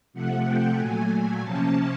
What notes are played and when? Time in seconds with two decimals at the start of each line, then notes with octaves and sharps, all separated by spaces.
0.13 C3 F3 A3 F#5
0.45 G5
0.77 A#2 F#3 A3 G#5
1.10 G#5
1.42 C3 F3 A#3 C#4 A5